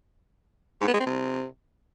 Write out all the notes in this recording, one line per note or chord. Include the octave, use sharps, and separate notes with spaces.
G#2
B3
G#3
C4
C3